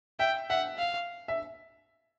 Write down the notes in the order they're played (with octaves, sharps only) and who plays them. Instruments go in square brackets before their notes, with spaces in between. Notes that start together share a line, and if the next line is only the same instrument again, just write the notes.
[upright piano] E5 [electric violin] G5
[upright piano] E5 [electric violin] F#5
[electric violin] F5
[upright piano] E5